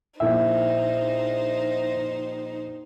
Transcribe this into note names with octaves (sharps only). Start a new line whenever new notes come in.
A#1 A#2 D#4 E4 C5 E5 G5